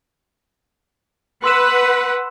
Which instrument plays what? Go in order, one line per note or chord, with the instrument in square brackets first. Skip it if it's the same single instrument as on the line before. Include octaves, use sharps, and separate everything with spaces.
[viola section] B4 F#5 [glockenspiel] C6 E6 E7